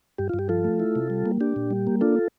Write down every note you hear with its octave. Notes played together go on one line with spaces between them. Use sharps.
G2 G4
F4
G2
G4
F3 F4 A4
A3
E4
C3
G3
A#3
D4 G4
A#2
G3
A#3
D4 F4 A4